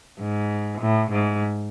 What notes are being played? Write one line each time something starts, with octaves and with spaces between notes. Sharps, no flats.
G#2
A2
G#2